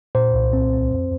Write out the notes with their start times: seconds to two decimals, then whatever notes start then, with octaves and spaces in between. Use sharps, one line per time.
0.15 A#2 C5
0.35 C2
0.53 C4
0.73 C4
0.91 F2